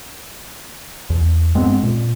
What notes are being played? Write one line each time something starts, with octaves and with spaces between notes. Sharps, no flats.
E2
G2 G#3 B3 C4
A#2